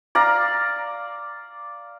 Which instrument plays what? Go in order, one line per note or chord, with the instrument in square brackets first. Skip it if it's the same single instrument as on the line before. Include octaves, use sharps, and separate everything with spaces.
[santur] D5 F5 A#5